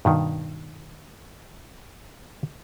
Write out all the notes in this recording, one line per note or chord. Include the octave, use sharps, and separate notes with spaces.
G2 B2 D#3